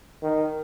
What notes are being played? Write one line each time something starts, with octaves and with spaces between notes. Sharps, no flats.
D#3